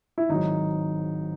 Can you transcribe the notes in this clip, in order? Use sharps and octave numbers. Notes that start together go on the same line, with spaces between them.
E4
G#1 G#2 F#3 D#4